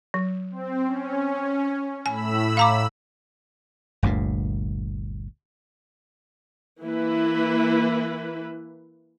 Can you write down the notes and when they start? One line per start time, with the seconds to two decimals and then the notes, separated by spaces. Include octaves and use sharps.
0.14 F#3
0.51 C4
0.86 C#4
2.06 A2 G#5 B5 E6
2.57 F5 A#5 D6
4.03 G1 D2 G2 A#2
6.82 E3 A#3 E4 B4